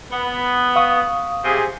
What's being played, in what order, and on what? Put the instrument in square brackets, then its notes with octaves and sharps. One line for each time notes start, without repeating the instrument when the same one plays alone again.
[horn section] B3
[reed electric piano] F5 C#6 D#6
[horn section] C3 G#4